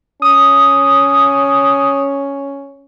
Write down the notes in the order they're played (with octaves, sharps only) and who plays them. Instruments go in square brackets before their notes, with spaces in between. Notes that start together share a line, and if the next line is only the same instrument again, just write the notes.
[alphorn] C#4 [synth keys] D#6